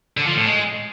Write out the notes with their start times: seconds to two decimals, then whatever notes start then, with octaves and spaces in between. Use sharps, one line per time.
0.17 D3
0.27 F3
0.36 A2
0.46 G#3